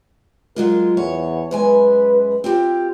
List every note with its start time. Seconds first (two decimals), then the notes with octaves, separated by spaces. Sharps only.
0.56 F#3 G#3 F4 A#4
0.97 E2 C#5
1.51 F#2 G#3 B4 G#5
2.44 C4 F4 G4